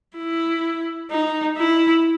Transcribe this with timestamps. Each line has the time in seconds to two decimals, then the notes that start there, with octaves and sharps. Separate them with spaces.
0.18 E4
1.11 D#4
1.57 E4